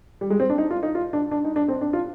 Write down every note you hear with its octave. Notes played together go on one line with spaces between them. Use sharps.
G3
G#3
C4
D4
D#4
F4
D#4
F4
D4
D4
D#4
D4
C4
D4
F4